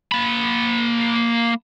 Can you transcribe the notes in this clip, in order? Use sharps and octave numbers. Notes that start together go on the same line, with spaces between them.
A#3 B5